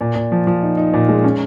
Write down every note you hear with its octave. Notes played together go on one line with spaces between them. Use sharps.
A#2
A#2
F3
F3
D#4
D#4
A#2
G#3
C#4